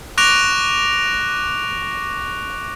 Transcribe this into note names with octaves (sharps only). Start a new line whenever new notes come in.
C#6 D6 F#6 A#6 D7 F7